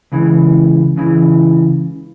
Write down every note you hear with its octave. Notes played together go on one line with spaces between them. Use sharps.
C#2 C#3 E3
C#2 C#3 E3